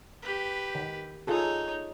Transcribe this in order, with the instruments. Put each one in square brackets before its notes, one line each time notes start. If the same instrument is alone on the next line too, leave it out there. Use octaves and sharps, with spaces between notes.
[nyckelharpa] G4 B4
[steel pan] D#3
[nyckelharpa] D#4 C#5 [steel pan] F4 G#4 A4